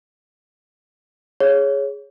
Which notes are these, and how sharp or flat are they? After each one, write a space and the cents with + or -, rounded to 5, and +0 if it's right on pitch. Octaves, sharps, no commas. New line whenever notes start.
G#4 +0 C#5 +0